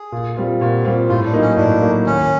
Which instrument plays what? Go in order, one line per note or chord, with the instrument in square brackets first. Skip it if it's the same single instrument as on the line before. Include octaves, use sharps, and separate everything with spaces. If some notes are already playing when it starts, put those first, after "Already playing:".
Already playing: [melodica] G#4
[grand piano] A#2
G3 C4 F4
[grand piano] A#2 [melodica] F#4
[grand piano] G3 C4 F4
[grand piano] A2 [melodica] F4
[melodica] D4
[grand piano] F#3 A#3 D#4
[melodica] C#4
[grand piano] A2 [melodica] D4
[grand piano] F#3 A#3 D#4
[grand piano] D#2 [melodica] C#4